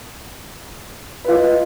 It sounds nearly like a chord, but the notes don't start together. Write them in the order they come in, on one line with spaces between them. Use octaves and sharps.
B4 F4 D#5